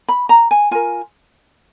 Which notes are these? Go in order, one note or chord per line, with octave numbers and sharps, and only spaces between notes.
B5
A#5
G#5
F4 A#4 G#5